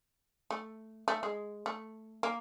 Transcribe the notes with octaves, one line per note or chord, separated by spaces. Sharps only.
A3
A3
G#3
A3
A#3